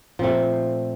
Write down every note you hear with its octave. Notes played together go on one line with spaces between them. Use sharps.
A#2 F3 A3 C4 C5